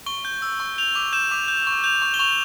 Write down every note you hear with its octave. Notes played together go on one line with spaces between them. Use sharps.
C#6 G7
G6
E6
C#6
G6 F7
D6
G6 E7
D6
G6
C#6
G6 F7
C#6
G7
C#6 F7